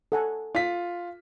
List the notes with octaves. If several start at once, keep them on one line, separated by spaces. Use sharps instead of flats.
A4 F#5 G#5
F4 B6